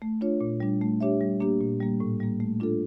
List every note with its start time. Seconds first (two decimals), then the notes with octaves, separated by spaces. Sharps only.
0.02 A3
0.21 D4 F4 C#5
0.41 A#2
0.60 G3 D4
0.81 A3
1.01 D4 G4 C#5 E5
1.21 G3
1.41 A#3 D4 G4
1.61 A#2
1.80 G3 A#3
2.00 A2
2.20 G3 A#3
2.40 A3
2.60 D4 F4 A4